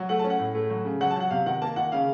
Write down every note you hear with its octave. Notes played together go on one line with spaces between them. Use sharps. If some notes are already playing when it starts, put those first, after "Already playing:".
Already playing: F#3
A3 F#5
A5
C#4
F#5
A2
A3
F#3
C#3
F#3 F#5
A5
F#3 F#5
C3 F5
D#3 F#5
A#3 A5
D#3 F#5
C#3 F5